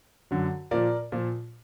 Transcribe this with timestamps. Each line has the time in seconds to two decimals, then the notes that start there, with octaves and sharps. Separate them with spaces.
0.31 F#2 D3 F#3
0.71 A#2 F3 A#4 D5
1.12 A#2 F3